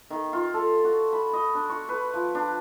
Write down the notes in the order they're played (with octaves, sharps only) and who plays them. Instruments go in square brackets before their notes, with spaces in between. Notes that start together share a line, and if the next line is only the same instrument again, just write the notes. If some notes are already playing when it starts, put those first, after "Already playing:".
[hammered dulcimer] D#3
F4
A4
F#4
B5
D#5
D4
C#6
B4
F3
D4